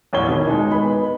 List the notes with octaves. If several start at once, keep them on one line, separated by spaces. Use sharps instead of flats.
A1 E2 C#5 G7
B2 D#3
G#3 D#4
B3 B5